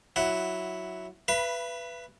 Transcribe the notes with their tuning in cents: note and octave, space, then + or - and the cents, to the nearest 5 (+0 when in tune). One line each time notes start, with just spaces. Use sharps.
F#3 +0 E4 +0 F#5 +10
B4 +0 E5 +45 B5 -15